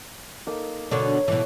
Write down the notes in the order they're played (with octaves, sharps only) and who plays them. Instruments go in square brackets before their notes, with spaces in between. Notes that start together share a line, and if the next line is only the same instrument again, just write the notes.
[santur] A#3 D#4 A4
[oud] B2 D3 D4 [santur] A4 C#5
[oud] B2 E3 [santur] A4